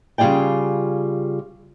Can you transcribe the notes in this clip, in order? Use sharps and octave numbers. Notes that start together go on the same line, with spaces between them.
C#3 G3 F4 G#4 D5 G5